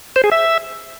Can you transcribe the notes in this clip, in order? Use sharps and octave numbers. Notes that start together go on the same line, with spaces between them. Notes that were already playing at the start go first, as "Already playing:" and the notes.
C5
G#4
E5